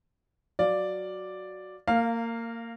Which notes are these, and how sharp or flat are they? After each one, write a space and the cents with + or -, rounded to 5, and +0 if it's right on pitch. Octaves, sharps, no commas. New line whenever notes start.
F#3 +0 D5 +0 F5 +5
A#3 -20 F5 +0